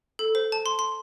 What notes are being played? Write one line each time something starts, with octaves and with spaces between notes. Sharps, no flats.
A4
C5
A5
C6
C6